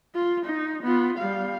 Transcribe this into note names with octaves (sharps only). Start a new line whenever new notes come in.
F4
D#4
B3 F4
G3 F5